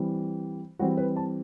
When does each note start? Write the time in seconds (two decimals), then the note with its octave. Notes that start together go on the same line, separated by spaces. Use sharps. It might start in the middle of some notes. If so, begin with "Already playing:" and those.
Already playing: E3 G3 C4
0.79 E3 G3 C4 F#4
0.97 B4
1.16 A5